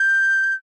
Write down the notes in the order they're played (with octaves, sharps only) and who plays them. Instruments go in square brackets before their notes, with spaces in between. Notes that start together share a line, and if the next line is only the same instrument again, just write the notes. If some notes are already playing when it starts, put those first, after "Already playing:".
Already playing: [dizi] G6